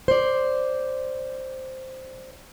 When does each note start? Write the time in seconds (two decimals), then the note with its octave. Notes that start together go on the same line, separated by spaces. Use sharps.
0.08 C5 D5